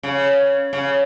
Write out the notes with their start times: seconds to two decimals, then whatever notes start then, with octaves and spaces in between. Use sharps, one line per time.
0.03 C#3
0.73 C#3